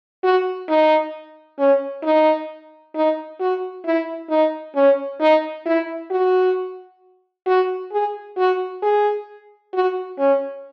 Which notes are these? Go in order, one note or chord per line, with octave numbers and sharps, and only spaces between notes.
F#4
D#4
C#4
D#4
D#4
F#4
E4
D#4
C#4
D#4
E4
F#4
F#4
G#4
F#4
G#4
F#4
C#4